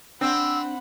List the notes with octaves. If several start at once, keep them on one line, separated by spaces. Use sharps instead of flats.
C4 D4 F#5 B5 E6